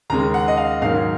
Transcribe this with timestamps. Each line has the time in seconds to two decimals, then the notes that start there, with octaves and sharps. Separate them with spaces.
0.10 D#2 C#3 G#3 A#5
0.34 F#5
0.48 D#5
0.57 F5
0.82 G#2 D#3 F#3 A#3 F5